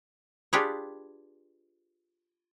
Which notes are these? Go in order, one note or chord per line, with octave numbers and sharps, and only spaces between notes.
D4 F4 G4 G#4 B4 C#5